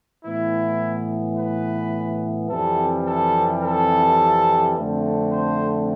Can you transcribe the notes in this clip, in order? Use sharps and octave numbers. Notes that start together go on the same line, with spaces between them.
A2 E3 B3 E4
B4
F2 C3 E3 G3 A4
A4
A4
F2 D3 A3 C4
C5